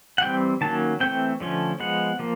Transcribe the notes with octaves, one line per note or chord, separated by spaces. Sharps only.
F#5
E3 G3 C4 G5
D#3 F#3 A#3 C#4 A5
E3 A3 C4 G5
D3 F3 A3 C#4
F3 G#3 B3 F#5
F3 A#3